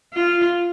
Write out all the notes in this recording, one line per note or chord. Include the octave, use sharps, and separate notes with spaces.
F4